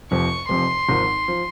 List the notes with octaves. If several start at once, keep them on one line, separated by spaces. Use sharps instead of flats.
F1 F2 C3 C#6
F1 F2 C3 C6
G#1 G#2 F3
F3